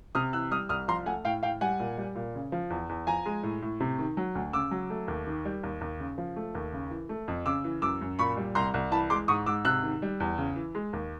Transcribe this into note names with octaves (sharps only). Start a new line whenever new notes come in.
C3 D#6 F6
E3 E6 F#6
G3 D#6 F6
C2 D#6 F6
F3 A#5 C6
A3 F#5 G#5
A2 F5 G5
A2 F5 G5
G3 F#5 G#5
A#2
G3
A#2
C#3
F3
E2
E2
F3 G#5 A#5
G#3
A2
A2
C3
D#3
F#3
D2
C#3 D6 E6
F#3
A3
D#2
D#3
G3
D#2
D#2
C#3
F3
A3
D#2
C#3
E3
A3
F2
C#3 D6 E6
E3
F#2 D6 E6
F#2
A#2 B5 C#6
G3
C2 A#5 C6
C2
E3 A5 B5
G#3 C6 D6
G#2 C#6 D#6
G#2 D6 E6
C3 E6 F#6
D#3
G3
E2
C#3
E3
G#3
D#2